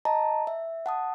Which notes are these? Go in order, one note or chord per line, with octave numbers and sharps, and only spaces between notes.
D#5 A5 A#5
E5
F#5 A5 D#6